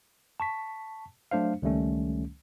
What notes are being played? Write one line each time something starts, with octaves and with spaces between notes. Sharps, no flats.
A5 C#6 B6
F#3 A3 D4 C5 F5
C#2 D#3 G3 A3 C#4